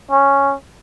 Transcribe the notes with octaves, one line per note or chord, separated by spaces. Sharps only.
C#4